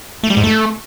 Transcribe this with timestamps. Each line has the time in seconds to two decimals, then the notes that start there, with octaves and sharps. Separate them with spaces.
0.23 A3
0.30 G3
0.37 G#2
0.44 A3